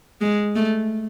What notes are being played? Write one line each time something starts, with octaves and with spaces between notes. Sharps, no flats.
G#3
A3